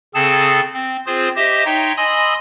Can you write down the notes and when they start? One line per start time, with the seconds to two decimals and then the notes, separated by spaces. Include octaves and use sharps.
0.14 C#3 C4 G#4 A4 A5 A6
0.74 C4
1.06 C4 F4 G#4 C5
1.36 G4 C5 D#5 E5
1.65 D#4 C#5 E5 G5 C6
1.97 D#5 G#5 B5 C6 D#6 E6